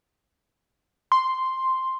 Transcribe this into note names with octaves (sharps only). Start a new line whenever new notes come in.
C6